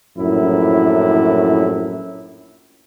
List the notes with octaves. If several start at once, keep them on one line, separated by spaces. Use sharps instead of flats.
A#1 F#2 A2 E4